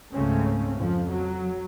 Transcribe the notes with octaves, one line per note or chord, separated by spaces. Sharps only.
C#2 G#2 C#3 A3 C4 C#4
F2 F3
F#3